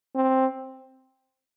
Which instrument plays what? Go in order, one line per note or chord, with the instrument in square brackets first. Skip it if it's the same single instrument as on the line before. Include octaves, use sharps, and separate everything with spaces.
[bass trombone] C4